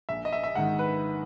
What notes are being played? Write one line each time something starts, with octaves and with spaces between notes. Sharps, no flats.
A#1 E5
D#5
E5
E5
G#2 D#3 F#5
B4